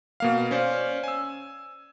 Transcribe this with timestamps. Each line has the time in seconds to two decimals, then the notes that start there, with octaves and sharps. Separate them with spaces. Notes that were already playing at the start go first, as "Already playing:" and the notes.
0.20 B2 A#3 F5
0.51 C#4 C5 D5 F5
1.04 G#5 E6